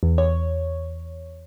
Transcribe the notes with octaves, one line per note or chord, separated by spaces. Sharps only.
E2
C#5